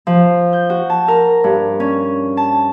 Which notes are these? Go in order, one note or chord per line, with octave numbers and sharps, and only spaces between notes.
F3
G6
F#4
A5
A#4
G2
C#4
A5